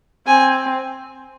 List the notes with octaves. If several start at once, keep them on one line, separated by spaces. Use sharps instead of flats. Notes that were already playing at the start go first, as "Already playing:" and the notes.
C4 G#5